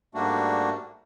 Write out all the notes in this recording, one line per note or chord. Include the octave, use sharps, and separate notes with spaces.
G#2 G3 A3 A#3 D4 F#4